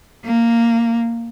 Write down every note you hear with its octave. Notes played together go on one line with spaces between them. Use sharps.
A#3